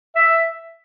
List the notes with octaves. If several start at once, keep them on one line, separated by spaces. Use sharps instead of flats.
E5